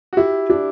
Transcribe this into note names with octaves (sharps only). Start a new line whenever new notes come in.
F#4
E4 G4
D4 G4